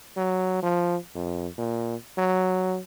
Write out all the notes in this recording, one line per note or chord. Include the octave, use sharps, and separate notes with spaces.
F#3
F3
F2
A#2
F#3